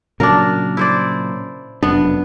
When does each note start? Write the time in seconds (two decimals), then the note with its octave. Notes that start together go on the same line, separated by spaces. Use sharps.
0.20 A#2 C#3 F#3 D4 A#4
0.77 E4 C5 D5
1.83 F1 F#2 B3 D4